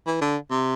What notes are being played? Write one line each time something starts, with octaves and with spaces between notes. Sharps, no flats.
E3
D3
C3